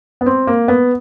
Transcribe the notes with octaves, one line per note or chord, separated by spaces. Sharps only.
B3
C4
A#3
B3